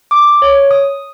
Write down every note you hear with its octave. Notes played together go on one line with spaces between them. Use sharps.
D6
C#5
D#6